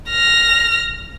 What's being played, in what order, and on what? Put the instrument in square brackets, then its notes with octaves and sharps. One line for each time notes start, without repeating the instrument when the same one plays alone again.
[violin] F6 A#6